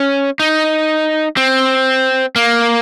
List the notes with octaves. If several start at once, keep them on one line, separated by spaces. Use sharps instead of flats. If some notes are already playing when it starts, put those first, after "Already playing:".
Already playing: C#4
D#4
C4
A#3